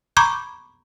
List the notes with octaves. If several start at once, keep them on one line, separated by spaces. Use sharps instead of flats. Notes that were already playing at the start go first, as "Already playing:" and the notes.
A#5 B5 C#6 D6 G6 G#6